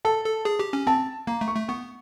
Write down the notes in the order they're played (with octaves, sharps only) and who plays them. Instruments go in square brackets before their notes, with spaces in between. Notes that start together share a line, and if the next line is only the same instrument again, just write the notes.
[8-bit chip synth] A4 [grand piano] A5
[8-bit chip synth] A4
G#4
G4
C#4
[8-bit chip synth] C4 [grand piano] A5
[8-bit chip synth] A#3 [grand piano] A#5
[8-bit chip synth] A3
[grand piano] C#6
[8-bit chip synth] A3
[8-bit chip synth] B3 [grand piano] C#6